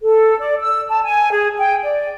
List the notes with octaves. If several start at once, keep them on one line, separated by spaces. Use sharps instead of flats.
A4
D5
E6
A5
G#5
G#4
G5
D5